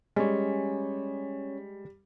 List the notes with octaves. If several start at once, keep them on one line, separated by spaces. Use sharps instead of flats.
G3 G#3 C#4 C#5